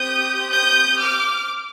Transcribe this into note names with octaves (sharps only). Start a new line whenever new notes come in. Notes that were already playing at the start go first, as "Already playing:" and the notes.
Already playing: C4 G4 D#6 G6
D#6 G6
D6 F6